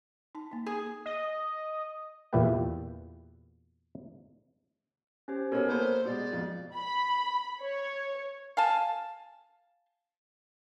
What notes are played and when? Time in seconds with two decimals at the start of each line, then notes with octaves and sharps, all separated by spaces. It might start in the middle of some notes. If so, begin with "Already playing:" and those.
0.35 D#4 A5
0.51 A#3 D#4
0.66 G#4
1.06 D#5
2.33 E2 A#2 E4 G4 B4 G5
5.28 C#4 G4 C5
5.52 B2 C#4 A4 A#4 C#5
5.69 A#3 B3 C5 G6
6.05 B2 G#3 D5
6.33 F2 B2
6.75 B5
7.63 C#5
8.57 F5 G#5 A5